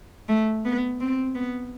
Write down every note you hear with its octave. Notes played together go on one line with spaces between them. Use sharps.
A3
B3
C4
B3